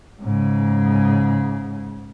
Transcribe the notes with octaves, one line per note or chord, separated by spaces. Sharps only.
G#2 C#3